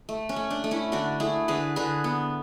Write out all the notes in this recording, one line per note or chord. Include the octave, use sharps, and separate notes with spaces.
A3
C#4
A3
D4
A3
C#4 E4
D3 D4 F#4
A3 E4 G#4
D3 G#4 B4
D3 G#4 B4
B3